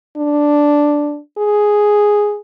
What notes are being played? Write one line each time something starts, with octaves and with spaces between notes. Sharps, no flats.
D4
G#4